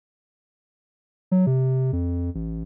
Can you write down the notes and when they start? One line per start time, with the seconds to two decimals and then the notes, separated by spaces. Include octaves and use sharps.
1.32 F#3
1.46 C3
1.93 F2
2.35 A1